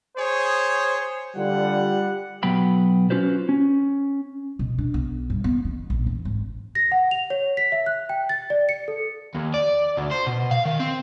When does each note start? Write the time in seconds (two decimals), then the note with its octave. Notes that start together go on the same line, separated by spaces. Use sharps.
0.17 G#4 C5 C#5
1.36 D3 G3 F4 F#5
2.43 B1 F#3 B3 G5 B5
3.10 C#4 F4 F#4 B4 C5
3.49 C#4
4.59 B2
4.78 D4
4.94 B1
5.30 G2
5.44 B3
5.65 D#3
5.90 A#1
6.07 E2
6.25 G#1
6.75 A#6
6.92 F#5
7.11 F7
7.30 C#5
7.57 B6
7.72 E5
7.86 F#6
8.09 G5
8.29 A6
8.50 D5
8.69 C#7
8.88 A4
9.35 D#2
9.54 D5
9.98 D2
10.11 C5
10.27 B2
10.51 F5
10.65 D#3
10.79 C4